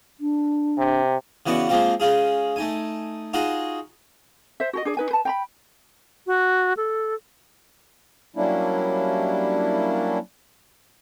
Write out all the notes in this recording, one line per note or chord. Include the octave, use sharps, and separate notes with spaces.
D4
C3
C#3 E3 B3 F#4 D5 C#6
F3 G#3 A#3 C4 F4
G#3 C#4 F4 G#4
A3 D#4 G#5
D#4 F4 F#4 G#4
C5 E5
F#4 G4 D#5
D4 G#4 C#5 D5
D#4 B4 G#5
B4 A5
G5 A#5 B5
F#4
A4
F#3 G3 A#3 C#4 D4 E4